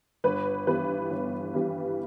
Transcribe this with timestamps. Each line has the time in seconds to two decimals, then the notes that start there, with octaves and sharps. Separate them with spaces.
0.24 G1 B4
0.67 G2 E3 G3 B3 B4
1.10 G1
1.54 G2 E3 G3 B3